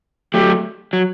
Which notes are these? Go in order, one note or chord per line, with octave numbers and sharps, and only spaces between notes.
F#3 A3 G4
F#3